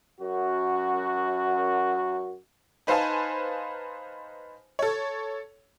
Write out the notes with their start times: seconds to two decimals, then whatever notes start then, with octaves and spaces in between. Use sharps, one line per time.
0.21 F#2 F#4
2.87 D#4 B4 C5 F5 G#5 A5
4.79 A4 C#5